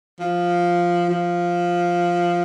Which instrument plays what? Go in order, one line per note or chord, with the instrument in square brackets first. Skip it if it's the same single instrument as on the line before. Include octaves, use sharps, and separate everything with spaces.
[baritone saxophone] F3
F3